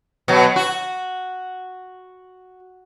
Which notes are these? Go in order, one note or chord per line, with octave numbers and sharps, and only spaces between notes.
B2 F#3
F#4